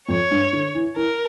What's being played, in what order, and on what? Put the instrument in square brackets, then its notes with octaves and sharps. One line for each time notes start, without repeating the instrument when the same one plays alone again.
[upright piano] F2 [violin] C#5
[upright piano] G2
D3
E3
[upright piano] E3 [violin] A#4